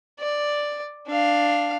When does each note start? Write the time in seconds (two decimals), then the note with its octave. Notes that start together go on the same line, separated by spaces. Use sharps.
0.20 D5
1.08 D4 F5